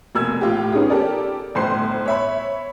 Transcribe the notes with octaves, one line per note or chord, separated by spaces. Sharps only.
F1 B2 A#3 E6 G#6
A2 F4 G4
B3 C#4 D#4 F4 G4 G#4
G4 A4 A#4 D5
G1 A2 C5 C6 C7
C#5 E5 B5